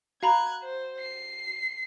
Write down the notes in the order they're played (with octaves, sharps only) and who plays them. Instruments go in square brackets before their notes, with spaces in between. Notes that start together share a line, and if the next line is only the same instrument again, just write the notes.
[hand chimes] F#4 [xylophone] F5 A#5 B5 [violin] F#6 G#6
[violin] C5
C7